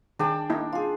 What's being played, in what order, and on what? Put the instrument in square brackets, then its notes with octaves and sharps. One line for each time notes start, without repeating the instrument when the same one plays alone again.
[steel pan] D#3 G#4 [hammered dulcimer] D4 G5 A5
[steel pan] A#3 D#4 E4
[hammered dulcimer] F4 G#4